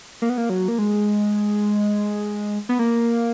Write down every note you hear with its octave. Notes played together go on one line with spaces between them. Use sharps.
A#3
B3
A#3
F#3
A#3
G#3
B3
A#3